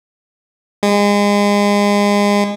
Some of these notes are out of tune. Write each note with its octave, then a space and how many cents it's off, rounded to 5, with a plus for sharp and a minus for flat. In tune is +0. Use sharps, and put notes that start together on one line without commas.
G#3 -30